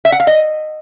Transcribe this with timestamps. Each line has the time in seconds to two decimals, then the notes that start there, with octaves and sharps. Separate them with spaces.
0.05 E5
0.12 F#5
0.20 F5
0.27 D#5